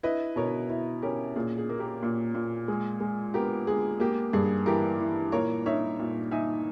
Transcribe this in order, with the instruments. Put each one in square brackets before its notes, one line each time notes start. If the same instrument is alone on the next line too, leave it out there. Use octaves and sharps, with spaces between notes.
[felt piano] E4 [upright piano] B4 D#5
[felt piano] B2 [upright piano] A#4 C#5
[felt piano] E4
[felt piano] C#4 [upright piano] G4 A#4
[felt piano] A#2 [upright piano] G#4
[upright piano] G#4
[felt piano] A#3
[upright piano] G4 A#4
[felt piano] A#2
A#2
G#3
G#3
[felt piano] B3 [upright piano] G4 A#4
[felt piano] G#3 [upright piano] G#4
[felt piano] A#3 [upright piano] G4
[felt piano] G2 [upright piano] G#4
[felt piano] E3 [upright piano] G4 A#4
[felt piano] E3
[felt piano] A#2 [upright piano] A#4 C#5
[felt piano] D#4 [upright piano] C#5 E5
[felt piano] A#2
[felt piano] D#4 [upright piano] E5 G#5